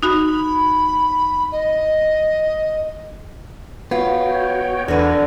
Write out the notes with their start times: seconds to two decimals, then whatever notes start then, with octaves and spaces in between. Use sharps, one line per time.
0.03 D#4 F#4 B5
1.52 D#5
3.91 B3 F4 F#4 C#5 G5
4.88 E2 D3 F#4 A#4 B4 G#5